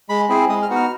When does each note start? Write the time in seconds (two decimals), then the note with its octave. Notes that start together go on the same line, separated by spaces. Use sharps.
0.09 G#3 B5
0.29 C4 E4 G#4
0.49 G#3 D#6
0.62 F6
0.70 B3 D#4 F#4
0.76 F6